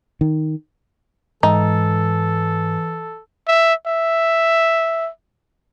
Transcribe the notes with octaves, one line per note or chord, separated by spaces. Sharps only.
D#3
G#2 E3 D#4 A4
E5
E5